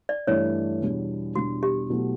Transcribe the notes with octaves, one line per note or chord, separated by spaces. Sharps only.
D5
G2 E3 A3 D4 C#5
E2 B2 G3 D4
E2 B2 G3 D4 F#4
G4
B2 F#3 A3 E4